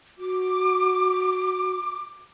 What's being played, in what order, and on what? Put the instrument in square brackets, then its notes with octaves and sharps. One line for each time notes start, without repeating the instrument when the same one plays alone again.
[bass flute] F#4 [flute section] D6